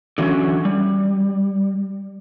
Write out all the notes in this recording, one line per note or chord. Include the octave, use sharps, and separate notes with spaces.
D3 E3 F#3 B3 C#4
G3